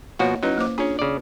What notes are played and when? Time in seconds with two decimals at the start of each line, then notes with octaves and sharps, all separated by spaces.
0.19 B2 F3 A#3 F#4 C#5 F#5
0.43 F#3 C#4 D#4 E4 B4
0.57 A#3 C5 D6
0.78 C#4 D4 F4 G#4
0.99 C#3 D5